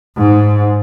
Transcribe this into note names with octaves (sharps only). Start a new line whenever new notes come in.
G#2